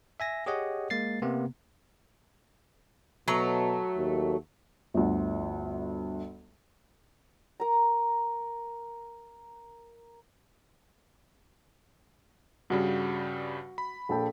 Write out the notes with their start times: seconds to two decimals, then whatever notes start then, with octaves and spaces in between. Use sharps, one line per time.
0.20 E5 G#5 A#6
0.46 G4 G#4 C#5 D#5 F#5
0.90 G#3 A#3 A6 C7
1.22 C3 A#3 B3
3.28 B2 F#3 A3 A#5
3.97 D#2
4.94 G1 D2
7.60 A#4 A#5
12.70 G2 C#3 G3 F#4
13.78 B5
14.09 A#1 A4 G5